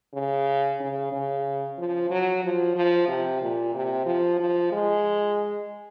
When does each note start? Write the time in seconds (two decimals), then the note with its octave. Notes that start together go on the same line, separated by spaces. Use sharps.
0.14 C#3
0.80 C#3
1.12 C#3
1.78 F3
2.10 F#3
2.43 F3
2.75 F3
3.08 C3
3.41 A#2
3.74 C3
4.06 F3
4.39 F3
4.72 G#3